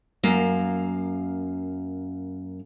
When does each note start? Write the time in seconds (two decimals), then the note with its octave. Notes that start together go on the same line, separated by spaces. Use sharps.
0.23 F#2 A#3 F5